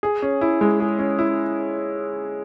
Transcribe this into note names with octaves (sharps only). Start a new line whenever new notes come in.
G#4
C#4
E4
G#3
G#4
C#4
E4